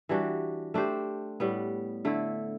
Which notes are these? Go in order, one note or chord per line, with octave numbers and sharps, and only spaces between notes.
E3 G3 D4 F#4
A3 D4 G4 C5
A2 G3 B3
D3 A3 E4